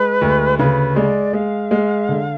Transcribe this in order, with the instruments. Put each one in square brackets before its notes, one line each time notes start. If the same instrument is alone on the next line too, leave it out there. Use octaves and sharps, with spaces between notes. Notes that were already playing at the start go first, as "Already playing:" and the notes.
Already playing: [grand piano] G#3 [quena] B4
[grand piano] D2
[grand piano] C#3 [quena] B4
[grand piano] G#3 [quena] D5
[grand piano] G#3 [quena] F5
[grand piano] G#3
D3